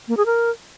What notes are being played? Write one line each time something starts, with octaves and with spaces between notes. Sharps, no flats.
A#3
G#4
A#4